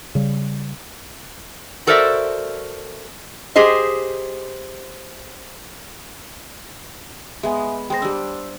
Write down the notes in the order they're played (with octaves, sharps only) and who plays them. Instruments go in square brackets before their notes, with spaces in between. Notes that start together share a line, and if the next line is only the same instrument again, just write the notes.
[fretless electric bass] C#3 G3
[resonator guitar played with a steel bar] F#4 A4 A#4 C5 D5 E5
G4 G#4 C5 D#5
[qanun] G#3 B3 [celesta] E5 G#5
[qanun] G#3 C5 [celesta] G5 A#6
[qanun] G3 D4 [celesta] E6